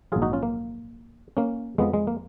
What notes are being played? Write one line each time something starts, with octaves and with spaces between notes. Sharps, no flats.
A#1 G#2 D#3 F#3 F4 G#4
D#4 F#4
C#4 F4
A#3
A#3 C#4
F2 F3 G#3 B3
G#3
A#3